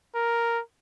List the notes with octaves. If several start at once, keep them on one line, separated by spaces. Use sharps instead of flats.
A#4